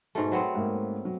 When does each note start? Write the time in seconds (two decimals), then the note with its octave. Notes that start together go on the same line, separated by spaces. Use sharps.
0.15 G#2 B2 A3
0.31 F#3 B3 C4
0.55 G#2 A3 A#3
1.05 F#3